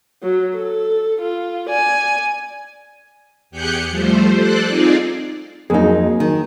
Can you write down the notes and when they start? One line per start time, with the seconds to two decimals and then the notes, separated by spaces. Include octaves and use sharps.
0.23 F#3
0.56 A4
1.21 F4
1.69 D5 G#5
3.50 E2 G4 G#4 F#6 G6 C#7
3.88 F3 G3 A3 C5
4.35 A4 C5 D5 F#6
4.66 C4 D#4 F4 G#4 D5
5.70 F2 F#3 A#3 D#4 G#4
6.20 D#3